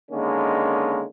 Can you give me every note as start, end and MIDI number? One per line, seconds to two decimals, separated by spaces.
0.11 1.05 50
0.11 1.05 51
0.11 1.05 56
0.11 1.05 58
0.11 1.05 61